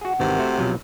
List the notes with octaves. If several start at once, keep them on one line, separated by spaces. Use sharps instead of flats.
F#4 G#4 F#5
G#1 C3 D#3 E3
A3 F#4 C5
B2 F3 F#3